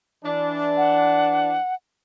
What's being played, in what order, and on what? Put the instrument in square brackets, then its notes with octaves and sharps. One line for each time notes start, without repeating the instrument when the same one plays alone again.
[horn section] E3 D4
[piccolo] F#5